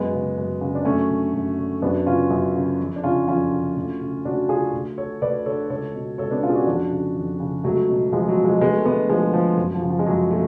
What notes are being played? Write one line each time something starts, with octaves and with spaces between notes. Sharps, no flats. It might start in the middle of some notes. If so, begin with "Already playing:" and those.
Already playing: F#2 G#3 B3
C#3
F#2
C#3
D4
F#2 A3 C#4
D3
F#2
D3
F#2 B3 D4
C#3 C#4 F4
F#2
C#3
F2
D4
C#3 C#4 F4
F2 C#4 F4
C#3
D2
C#3
D2 D4 F#4
C#3 F4 G#4
D2
D3 A4 C#5
D2 B4 D5
D3 A4 C#5
C#2 A4 C#5
B2
C#2 A4 C#5
B3 D4
B2 C#4 F4
G#4
D4 F#4
F2 D4 F#4
C#3
F2
C#3
C#2 F#3 A3
B2
C#2 F3 G#3
F#3
B2
F3 G#3
D2 G#3 B3
A3
D3 G#3 B3
D2 F3 G#3
D3 F3
F#2
F3
C#3
F3
G#3
F#2 F#3
C#3 F#3 A3